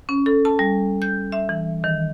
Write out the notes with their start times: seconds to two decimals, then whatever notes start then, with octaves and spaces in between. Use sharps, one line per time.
0.09 C#4
0.26 A4
0.45 A5
0.59 G3
1.02 G6
1.32 E5
1.49 E3
1.84 D#3